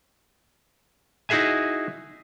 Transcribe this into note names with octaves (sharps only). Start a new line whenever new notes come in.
D#4 E4 F#4 G#4 E5 G#5